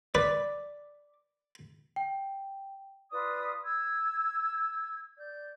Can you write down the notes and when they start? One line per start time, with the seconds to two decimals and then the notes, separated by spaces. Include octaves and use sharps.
0.15 B4 D5
1.96 G5
3.11 F4 B4 D5 D#6
3.64 E6 G#6
5.16 D5 G6